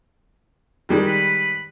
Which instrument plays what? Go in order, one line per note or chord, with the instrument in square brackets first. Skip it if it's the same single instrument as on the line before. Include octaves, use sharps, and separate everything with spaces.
[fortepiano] D#3 G3 G#3
[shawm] B4